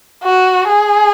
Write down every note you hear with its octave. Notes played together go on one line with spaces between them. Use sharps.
F#4
G#4